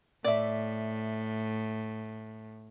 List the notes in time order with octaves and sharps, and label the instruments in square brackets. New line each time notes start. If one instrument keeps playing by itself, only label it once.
[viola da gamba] A2 [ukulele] D5 E5